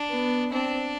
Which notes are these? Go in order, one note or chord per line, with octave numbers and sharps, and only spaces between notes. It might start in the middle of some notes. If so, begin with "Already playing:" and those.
Already playing: D4
B3
C4 D4